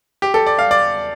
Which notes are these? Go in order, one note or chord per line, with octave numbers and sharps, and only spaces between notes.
G4
A4
D5
F5
D5